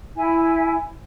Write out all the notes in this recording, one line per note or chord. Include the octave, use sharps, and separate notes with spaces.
E4 G#5